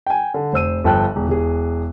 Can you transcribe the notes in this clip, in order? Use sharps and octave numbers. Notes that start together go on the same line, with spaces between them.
G5 G#5
D3
F1 C5 E6 D#7
G1 F3 A4 G5 A5 F#6
E1
E1 G#4